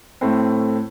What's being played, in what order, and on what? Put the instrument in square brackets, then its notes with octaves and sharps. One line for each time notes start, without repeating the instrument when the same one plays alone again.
[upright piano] A2 A3 C4